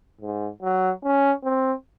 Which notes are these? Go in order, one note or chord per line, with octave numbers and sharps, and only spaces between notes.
G#2
F#3
C#4
C4